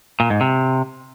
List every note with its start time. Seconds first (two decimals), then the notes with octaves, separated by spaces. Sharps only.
0.20 A#2
0.30 G#2
0.41 C3